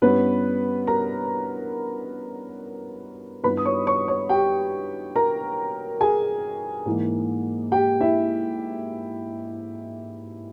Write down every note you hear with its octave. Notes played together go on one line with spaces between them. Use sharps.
G2 G3 B3 C#4 E4 B4
A#4 A#5
G2 D#3 G3 B3 E4 B4 B5
D#6
C#5 C#6
C#5 C#6
C#5 C#6
G4 G5
A#4 A#5
G#4 G#5
G#2 E3 A#3
G4 G5
E4 E5